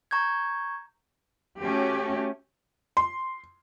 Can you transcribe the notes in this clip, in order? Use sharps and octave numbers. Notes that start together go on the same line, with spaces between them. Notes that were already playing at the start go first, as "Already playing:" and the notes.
A#5 C#6 G6 G#6
A3 C#4 F#4 G4
C6